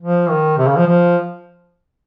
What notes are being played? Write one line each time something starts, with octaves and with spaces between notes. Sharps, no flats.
F3
D#3
C3
C#3
F3
F3